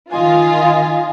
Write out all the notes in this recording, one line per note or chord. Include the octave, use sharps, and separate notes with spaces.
D#3 F4 D#5 G#5